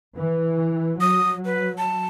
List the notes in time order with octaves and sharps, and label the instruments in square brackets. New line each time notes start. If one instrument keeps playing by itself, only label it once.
[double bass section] E3
[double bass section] F#3 [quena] D#6
[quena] B4
A5